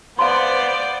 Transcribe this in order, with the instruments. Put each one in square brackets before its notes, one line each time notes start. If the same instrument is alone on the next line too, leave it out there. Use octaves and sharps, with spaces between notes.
[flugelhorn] B3 [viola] C5 D5 [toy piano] F5 A5 C6